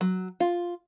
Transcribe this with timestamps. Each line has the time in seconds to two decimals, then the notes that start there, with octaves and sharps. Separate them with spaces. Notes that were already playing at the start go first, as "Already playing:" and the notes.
0.01 F#3
0.40 F4